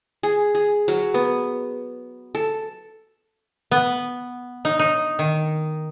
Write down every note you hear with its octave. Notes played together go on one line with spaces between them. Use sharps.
G#4
G#4
F#3
B3
A4
B3
D#4
D#4
D#3